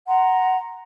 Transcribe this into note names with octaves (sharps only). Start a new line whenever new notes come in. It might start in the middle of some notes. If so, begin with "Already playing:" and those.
F#5 A#5 C6